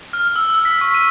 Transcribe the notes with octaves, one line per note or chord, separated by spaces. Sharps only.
F6
E6
E6
B6
C#6
D#7